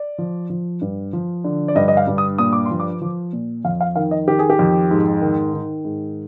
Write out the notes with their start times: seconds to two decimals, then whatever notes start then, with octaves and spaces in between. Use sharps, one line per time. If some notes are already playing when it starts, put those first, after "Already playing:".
Already playing: D5
0.18 F3
0.50 F3
0.81 G2
1.13 F3
1.44 D3
1.68 D5
1.75 G2 D#5
1.88 D#5
1.97 F5
2.08 G2
2.18 D#6
2.38 A#2 D#6
2.53 D6
2.66 C6
2.71 F3
2.80 D6
3.01 F3
3.33 A#2
3.65 F2 F5
3.81 F5
3.96 D#3 F5
4.11 D#5
4.27 D#3 G4
4.39 G#4
4.50 G4
4.59 F2
4.91 G#2
5.21 D#3
5.54 D#3
5.85 G#2